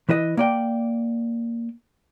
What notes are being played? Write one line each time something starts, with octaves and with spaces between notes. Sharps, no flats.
E3 E4 B4 D#5
A#3 D5 G5